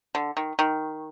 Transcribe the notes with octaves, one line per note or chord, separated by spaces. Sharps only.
D3
D#3
D#3